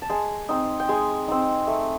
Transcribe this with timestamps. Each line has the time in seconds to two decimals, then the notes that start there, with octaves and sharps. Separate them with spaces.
0.02 A5
0.09 G#3 G#5
0.49 C4 D#4
0.80 G5
0.89 G#3 G#5
1.28 C4 D#4
1.67 A3